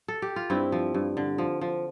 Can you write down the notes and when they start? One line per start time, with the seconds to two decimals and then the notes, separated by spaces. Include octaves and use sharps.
0.08 A4
0.22 G4
0.36 F4
0.50 G2 C4 E4
0.72 F3
0.94 G2
1.17 D3
1.38 F3
1.61 F3